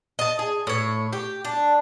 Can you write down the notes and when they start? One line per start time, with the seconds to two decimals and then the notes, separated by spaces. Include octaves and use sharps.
0.19 D#5 A5
0.39 G#4
0.67 A2 C#5
1.13 G4
1.45 D4